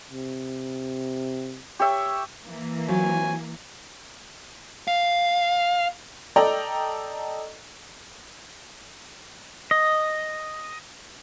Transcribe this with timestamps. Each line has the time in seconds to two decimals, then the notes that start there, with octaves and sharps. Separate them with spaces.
0.10 C3
1.79 G4 C#5 E5
2.44 E3 A#3
2.88 F#3 C4 F4 G#5
4.88 F5
6.36 A4 D5 D#5 G5 A#5
9.71 D#5